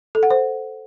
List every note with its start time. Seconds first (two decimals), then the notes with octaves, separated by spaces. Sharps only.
0.15 A4
0.23 F#5
0.31 C5